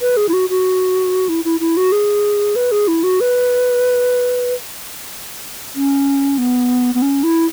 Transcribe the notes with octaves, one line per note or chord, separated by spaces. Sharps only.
B4
G#4
E4
F#4
F#4
E4
E4
E4
F#4
G#4
B4
G#4
E4
F#4
B4
C#4
B3
B3
C#4
E4